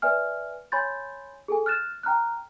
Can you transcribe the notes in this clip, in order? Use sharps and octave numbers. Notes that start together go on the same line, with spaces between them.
B4 D5 E5 G#5 F6
C#5 G#5 B5 C6 G6 A6
G#4 A4 G#5
F6 F#6 A6 E7
G5 A#5 F6 F#6